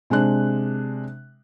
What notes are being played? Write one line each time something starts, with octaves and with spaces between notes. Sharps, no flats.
C3 G#3 D4 F#6